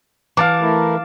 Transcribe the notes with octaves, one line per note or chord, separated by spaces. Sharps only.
E3 F5 A5 D6
A3 E4 A#4